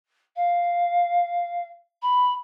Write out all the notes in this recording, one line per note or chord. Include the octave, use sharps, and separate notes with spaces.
F5
B5